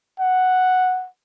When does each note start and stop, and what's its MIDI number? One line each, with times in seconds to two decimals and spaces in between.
0.20 1.07 78